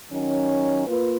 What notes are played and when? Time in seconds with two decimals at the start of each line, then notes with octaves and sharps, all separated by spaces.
0.11 D#3 F#3 C#4
0.87 A#3 F4 B4